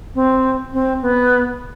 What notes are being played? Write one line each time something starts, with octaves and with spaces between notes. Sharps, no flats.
C4
C4
B3